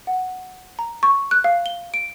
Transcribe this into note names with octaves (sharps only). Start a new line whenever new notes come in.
F#5
A#5
C#6
F#6
F5
G7
D7